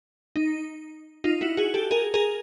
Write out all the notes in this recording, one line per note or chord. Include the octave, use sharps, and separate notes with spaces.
D#4
D#4 F4
E4 F#4
F#4 G#4
G4 A4
G#4 A#4
G#4 A#4